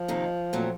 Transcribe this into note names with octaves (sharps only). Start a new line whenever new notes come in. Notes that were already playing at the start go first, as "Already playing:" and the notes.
Already playing: F3
C3 D#3 A#3 D#4
A#2 F#3 A3 C4